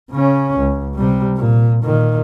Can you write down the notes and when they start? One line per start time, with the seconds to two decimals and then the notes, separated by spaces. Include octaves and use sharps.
0.11 C#3 C#4
0.59 C#2
0.95 C3 G3
1.37 A#2
1.83 A#2 D#3